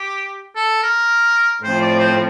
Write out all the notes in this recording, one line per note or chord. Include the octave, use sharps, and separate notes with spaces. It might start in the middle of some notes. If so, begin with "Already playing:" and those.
Already playing: G4
A4
A#4
A2 F3 C4 C5
D5
C5